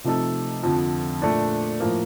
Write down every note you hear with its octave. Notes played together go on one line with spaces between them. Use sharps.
C3 F3 A3 D#4 A4
F2 D3 F3
A#2 A3 D4
A2 F3 A#3